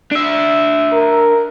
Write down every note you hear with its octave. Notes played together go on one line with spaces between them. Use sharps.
D4 E5
A#4